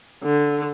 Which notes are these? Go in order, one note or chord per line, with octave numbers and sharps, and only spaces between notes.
D3